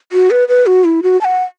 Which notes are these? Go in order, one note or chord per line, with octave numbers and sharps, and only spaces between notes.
F#4
B4
B4
F#4
E4
F#4
A5
F#5